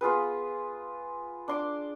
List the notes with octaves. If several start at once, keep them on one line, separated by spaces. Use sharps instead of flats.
B3 F4 G#4 B4
D4 C6 D6